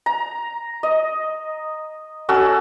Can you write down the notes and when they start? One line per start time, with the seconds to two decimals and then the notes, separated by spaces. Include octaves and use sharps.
0.06 A#5
0.83 D#5
2.29 C#4 F#4 A4 E6